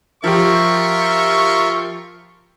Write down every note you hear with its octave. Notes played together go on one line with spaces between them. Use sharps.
F3 F4 G4 A#4 E5 C#6